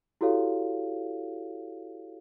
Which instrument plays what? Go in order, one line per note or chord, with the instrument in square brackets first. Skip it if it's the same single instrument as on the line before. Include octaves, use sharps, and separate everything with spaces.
[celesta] E4 F#4 G4 A4 C#5 F5